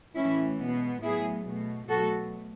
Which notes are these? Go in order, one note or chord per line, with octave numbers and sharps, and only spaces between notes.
A2 E3 A3 C#4 E4
B2 G#3 B3
A2 F#3 B3 E4 G#4
B2 A3
B2 F#3 A3 F#4 A4